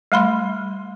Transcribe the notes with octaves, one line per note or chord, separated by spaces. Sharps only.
G3 A3 B5 C6